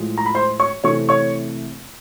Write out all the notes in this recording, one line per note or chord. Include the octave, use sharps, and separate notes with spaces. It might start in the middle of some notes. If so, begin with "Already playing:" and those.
Already playing: A2 F3 G#3
A#5
B5
C5 C6
C#5 C#6
C3 E3 A3 C4 E4 C#5 C#6
C#5 C#6